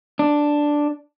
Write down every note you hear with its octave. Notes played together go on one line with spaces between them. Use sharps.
D4